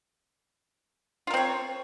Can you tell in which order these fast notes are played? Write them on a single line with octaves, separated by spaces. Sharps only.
F4 A#4 C4 C#5